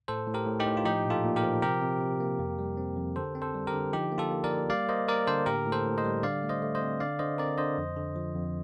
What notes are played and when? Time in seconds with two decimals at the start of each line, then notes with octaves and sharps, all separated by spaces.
0.08 A2 A4 C5
0.27 A2
0.34 G4 A#4
0.46 A2
0.60 D#4 G4
0.66 A2
0.77 F4
0.85 F3 D#4 G4
1.05 A#2
1.10 F4 A4
1.24 A#2
1.36 G4 A#4
1.44 F3
1.62 C3 G4 A#4
1.82 C3
2.01 C3
2.20 A#3
2.39 F2
2.59 G3
2.77 C4
2.97 F2
3.16 D3 A4 C5
3.35 C4
3.42 A4 C5
3.54 G3
3.67 G4 A#4
3.73 D3
3.93 F3 D#4 G4
4.12 A#3
4.18 F4 A4
4.31 A#3
4.44 A#4 D5
4.51 A#3
4.70 G3 D5 F5
4.89 A#3 C5 D#5
5.08 A#3 A#4 D5
5.27 D3 A4 C5
5.46 A2 G4 A#4
5.66 A2
5.72 A4 C5
5.86 A2
5.98 C5 D#5
6.05 G3
6.23 D3 D5 F5
6.43 A3
6.49 C5 D#5
6.62 A3
6.75 C5 D#5
6.82 C4
7.00 D3 D5 F5
7.19 D3 C5 D#5
7.38 C4 A#4 D5
7.58 D3 C5 D#5
7.78 F2
7.97 D3
8.16 F3
8.35 F2